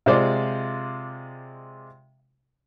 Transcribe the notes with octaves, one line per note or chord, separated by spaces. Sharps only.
C3 G#3 F4 C5 D5